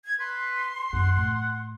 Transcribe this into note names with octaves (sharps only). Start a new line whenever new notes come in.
G#6
B4 C6
F#2 D#3 F#5
A2